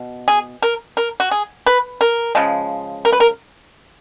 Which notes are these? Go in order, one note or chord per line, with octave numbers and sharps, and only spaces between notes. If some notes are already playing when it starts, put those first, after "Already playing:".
Already playing: B2
G#4
A#4
A#4
F#4
G#4
B4
A#4
C#3 F3 G#3
A#4
B4
A#4